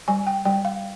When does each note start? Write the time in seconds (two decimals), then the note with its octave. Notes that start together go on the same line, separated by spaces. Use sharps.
0.08 G3 G#5
0.27 G5
0.45 G3 G5
0.65 F5